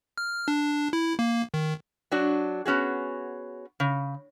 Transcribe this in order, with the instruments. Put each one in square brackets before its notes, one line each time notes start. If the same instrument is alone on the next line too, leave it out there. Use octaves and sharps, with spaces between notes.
[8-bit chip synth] F6
D4
E4
A#3
D#3
[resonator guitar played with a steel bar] F#3 D4 F#4
B3 C#4 F#4 G#4
C#3